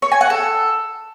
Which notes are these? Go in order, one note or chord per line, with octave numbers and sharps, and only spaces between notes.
C#5
G#5
F#5
A4